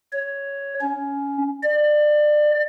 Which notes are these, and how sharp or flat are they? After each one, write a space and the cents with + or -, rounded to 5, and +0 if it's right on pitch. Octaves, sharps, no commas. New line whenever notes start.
C#5 +5
C#4 +15
D5 +25